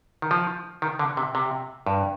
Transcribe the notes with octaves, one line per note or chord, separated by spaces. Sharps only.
D#3
F3
D#3
D3
C3
C3
G2